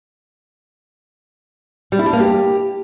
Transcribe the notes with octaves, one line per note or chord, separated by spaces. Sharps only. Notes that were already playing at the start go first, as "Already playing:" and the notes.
G3
E4
D4
A#3
G4